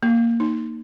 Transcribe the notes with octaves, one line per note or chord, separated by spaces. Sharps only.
A#3
D#4